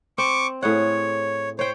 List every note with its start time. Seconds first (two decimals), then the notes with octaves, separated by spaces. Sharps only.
0.18 C4 C#6 D6
0.63 A2 G#4 C#5 F#5
1.59 C5 C#5 G5